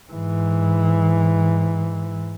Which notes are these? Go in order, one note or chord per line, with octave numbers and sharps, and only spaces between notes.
G#2 E3